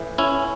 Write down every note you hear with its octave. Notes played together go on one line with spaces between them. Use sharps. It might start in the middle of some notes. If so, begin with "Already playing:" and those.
Already playing: A2 E3
C#4 E4